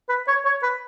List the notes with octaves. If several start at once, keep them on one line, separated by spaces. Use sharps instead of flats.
B4
C#5
C#5
B4